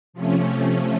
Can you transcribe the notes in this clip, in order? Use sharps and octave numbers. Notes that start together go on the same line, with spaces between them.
C3 F3 A3 C#4